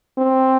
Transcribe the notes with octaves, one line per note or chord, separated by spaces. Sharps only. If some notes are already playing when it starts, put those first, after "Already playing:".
C4